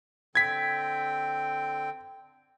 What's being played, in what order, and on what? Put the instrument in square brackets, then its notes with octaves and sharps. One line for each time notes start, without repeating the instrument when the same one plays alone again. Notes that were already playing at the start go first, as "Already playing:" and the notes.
[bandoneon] D3 C4 G5 [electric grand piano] G#6 B6